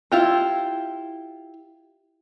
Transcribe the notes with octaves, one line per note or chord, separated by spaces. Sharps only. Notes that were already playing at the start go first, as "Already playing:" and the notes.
E4 F4 G4